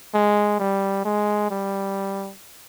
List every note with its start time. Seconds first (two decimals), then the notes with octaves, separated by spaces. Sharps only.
0.14 G#3
0.60 G3
1.05 G#3
1.50 G3